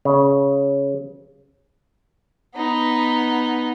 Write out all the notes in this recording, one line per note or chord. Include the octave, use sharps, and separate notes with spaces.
C#3
B3 D#4